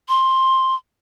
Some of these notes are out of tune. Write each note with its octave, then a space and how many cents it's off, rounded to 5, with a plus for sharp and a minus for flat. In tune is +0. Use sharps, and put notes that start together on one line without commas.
C6 +10